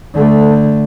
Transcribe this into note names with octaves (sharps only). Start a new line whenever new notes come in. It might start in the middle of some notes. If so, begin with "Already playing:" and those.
D3 A3